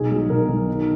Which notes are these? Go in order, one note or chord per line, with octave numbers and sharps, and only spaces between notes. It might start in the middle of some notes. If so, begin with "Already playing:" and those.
Already playing: B1 G#4
F#3
B1 A#4
B1
D#3